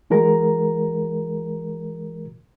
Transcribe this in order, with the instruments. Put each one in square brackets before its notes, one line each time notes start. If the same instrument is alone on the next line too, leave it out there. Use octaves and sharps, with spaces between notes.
[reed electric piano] E3 G#3 F#4 A#4 A#5